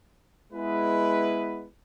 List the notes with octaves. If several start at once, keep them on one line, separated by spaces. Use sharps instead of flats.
G#3 B3 E4 B4